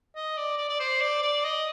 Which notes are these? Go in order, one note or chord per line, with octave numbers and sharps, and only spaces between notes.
D#5
D5
D5
D5
C5
D5
D5
D#5